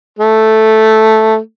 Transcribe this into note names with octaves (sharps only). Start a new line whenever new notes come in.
A3